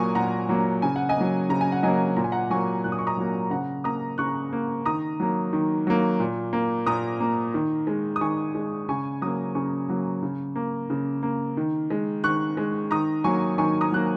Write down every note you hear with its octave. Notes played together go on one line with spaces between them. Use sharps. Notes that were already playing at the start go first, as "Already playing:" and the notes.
Already playing: A#2 F#3 A#3 G#5 A#5 C#6 D#6
A#2 F#5 A#5
F#3 A#3
C#3 G#5
F#5
D#5 G#5
F#3 A#3
C#3 A#5
G#5
F#5
F#3 A#3 D#5 G#5
A#2 A#5
G#5
F#5 A#5
F#3 A#3 G#5 C#6
A#2 F#6
D#6
C#6
A#5 D#6
F#3 A#3
C#3 F#5 A#5
A#3 A#5 D#6
C#3 C#6 F#6
A#3
D#3 A#5 D#6
F#3 A#3
D#3
F#3 A#3
A#2
A#3
A#2 A#5 D#6
A#3
D#3
G#3
D#6
D#3 G#5 C#6
G#3
C#3 G#5 C#6
F#3 A#3 A#5 D#6
C#3 G#5 C#6
F#3 A#3
C#3
A#3
C#3
A#3
D#3
G#3
D#3 C#6 F#6
G#3
D#3 A#5 D#6
F#3 A#3 G#5 C#6
D#3 G#5 C#6
A#5 D#6
F#3 A#3 F#6